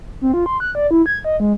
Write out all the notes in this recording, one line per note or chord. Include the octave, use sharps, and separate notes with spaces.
C4
F4
C6
F#6
D5
E4
G#6
D#5
G#3